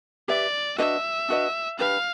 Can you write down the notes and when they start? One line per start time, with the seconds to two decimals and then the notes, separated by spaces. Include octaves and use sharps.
0.28 G4 B4 D5 E5
0.78 D4 F#4 B4 D#5 E5
1.28 D4 F#4 B4 D#5
1.79 D4 G4 B4 F5